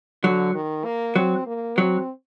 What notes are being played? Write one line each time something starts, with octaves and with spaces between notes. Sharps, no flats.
D3 F#3
D#3
A#3
F#3 C4
A#3
F#3 C4